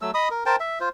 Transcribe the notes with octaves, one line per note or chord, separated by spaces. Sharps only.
F#3 A3 E6
D#5 B5 D#6
A#4
A#4 C5 G5 A5
E5
F4 C5